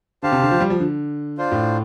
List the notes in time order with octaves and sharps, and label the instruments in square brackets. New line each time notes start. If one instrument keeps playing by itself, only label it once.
[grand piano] D3 [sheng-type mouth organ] G4 C5 F5 A5
[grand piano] C3
D3
F3
G3
F3
D3
[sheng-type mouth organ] D4 F4 C5
[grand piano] A2